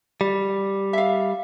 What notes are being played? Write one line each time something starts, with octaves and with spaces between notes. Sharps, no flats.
G3
E5 F5